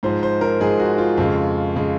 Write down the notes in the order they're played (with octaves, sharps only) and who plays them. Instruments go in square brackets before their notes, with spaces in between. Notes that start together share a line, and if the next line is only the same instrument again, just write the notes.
[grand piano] G#2 F3 G#3 C5
C5
A#4
G#2 F3 G#3 G#4
F#4
F4
F2 C#3 G#3
C#3 G#3